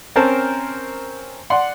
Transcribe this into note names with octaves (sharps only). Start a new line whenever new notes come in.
C4 C#4 A#4 C5 A5
D5 F#5 C6